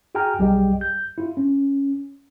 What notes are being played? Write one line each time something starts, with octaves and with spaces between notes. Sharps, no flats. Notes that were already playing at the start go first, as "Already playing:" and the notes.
F#4 G#4 G5 G#5 A#5 F6
B1 G3 G4 G#4 D#5 G5
G6
E4 F4
C#4